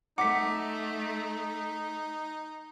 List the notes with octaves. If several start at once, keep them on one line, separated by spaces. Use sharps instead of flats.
A3 D#4 F#5 D6 B6